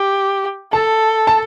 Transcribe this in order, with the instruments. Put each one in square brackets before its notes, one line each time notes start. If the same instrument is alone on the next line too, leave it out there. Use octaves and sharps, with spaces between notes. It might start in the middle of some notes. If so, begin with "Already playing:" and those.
Already playing: [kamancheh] G4
[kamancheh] A4 [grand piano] A5
[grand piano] A5